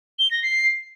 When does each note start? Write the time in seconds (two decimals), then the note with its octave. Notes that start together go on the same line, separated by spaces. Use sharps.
0.19 G7
0.31 A#6
0.43 C7